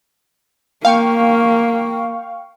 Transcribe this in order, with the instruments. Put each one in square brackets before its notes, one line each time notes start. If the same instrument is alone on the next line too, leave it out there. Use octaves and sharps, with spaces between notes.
[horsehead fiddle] A#3 [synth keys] F5 G5 C#6